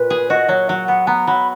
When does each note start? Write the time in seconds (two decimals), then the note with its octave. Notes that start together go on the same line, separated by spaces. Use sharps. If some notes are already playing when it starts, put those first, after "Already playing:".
Already playing: A#2 B4
0.10 G#4
0.30 F#4 D#5
0.49 F#3 C#5
0.69 F#3 F#5
0.88 B3 F#5
1.07 B3 A#5
1.27 F#3 B5